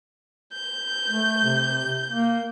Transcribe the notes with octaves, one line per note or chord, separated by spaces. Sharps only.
G6
A3
C3
A#3